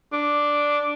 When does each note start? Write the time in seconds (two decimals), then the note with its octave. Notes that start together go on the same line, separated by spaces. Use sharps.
0.12 D4